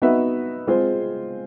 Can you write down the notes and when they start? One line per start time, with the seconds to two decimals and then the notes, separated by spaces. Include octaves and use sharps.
0.02 B3 D#4 F#4 B4 E5
0.67 G#3 C4 F4 G#4 C5